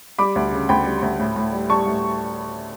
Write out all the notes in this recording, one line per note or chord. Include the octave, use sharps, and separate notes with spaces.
G3 B5 D6
D2
C#3
D2 G5 B5
G3
D2
A2
A2
G3
G3 A5 C#6
A2